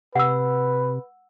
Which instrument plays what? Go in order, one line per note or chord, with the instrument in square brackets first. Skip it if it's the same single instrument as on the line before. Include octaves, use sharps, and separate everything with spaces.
[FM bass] C3 [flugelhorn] B4 [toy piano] F#5 E6